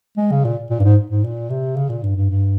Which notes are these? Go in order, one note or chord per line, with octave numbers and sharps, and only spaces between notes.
G#3
C#3
A#2
A#2
G2
G#2
G#2
A#2
C3
C#3
A#2
G2
G2
G2